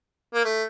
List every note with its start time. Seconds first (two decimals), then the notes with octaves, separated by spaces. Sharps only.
0.34 A#3
0.44 A3